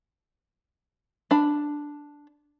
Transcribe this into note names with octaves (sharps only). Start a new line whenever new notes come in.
D4 B5